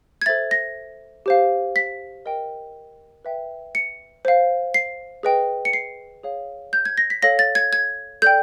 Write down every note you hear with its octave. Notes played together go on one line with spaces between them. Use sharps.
G#6
A4 C5 E5 A6
A#6
G4 C5 F5
B6
A#4 D#5 G5
B4 E5 G5
C#7
C5 F5
C7
G#4 B4 D#5 G5
C#7
C7
G#4 C#5 F5
G6
G#6
A#6
B6
A4 C#5 F5 A#6
A6
G#6
G#6
A4 D5 G5 G6